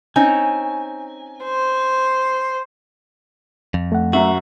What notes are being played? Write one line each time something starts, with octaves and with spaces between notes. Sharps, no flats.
C4 C#4 D#4 G#5
C5
F2
A3 F#5
F#2 F#4 E5